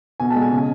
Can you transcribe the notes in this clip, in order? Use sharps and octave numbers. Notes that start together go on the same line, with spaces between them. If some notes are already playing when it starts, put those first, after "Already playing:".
B2 G#5
A5
G#3
G#5
C#3